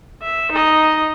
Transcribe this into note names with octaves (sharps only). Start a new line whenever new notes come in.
E5
D#4 D#5